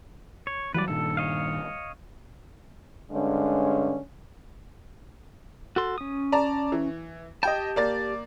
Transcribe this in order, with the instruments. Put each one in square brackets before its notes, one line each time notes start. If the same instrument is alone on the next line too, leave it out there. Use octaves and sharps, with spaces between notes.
[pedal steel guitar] C#5
[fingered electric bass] E3 F#3 G3 [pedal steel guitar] B4 D5
[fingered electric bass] G2 A#2 D#3 [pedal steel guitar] A4
[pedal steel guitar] C#5 D#5 F5
[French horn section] G2 D3 G#3 C#4
[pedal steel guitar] F#4 A4 C6
C#4 D#6
[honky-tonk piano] D5 A5 A#5
E3
[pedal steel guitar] G4 A5 [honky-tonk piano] D#5 G5
[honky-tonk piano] A#3 D5 A6